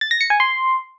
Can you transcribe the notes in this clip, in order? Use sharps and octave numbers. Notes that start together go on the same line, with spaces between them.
A6
A#6
C#7
G#5
C6